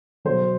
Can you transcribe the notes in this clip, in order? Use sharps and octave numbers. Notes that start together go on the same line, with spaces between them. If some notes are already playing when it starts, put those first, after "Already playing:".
B2 F#3 C5